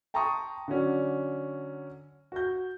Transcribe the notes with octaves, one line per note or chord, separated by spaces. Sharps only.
G5 A5 A#5 C6 C#6 D#6
D3 F#3 C#4 D4
F#4 G6